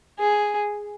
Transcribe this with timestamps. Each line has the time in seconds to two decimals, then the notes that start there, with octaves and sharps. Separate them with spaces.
0.19 G#4